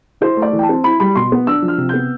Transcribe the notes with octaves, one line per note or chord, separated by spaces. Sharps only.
E4 C5
A3
D5
E3
G5
A5
C4
E4 B5
G3 B5
B2 C6
B3
D4 E6
F3
F6
C3
B3 G6